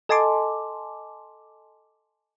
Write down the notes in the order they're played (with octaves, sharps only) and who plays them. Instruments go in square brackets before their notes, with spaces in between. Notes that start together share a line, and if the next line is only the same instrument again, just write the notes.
[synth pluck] A4 D#5 G#5 A5 C6 D6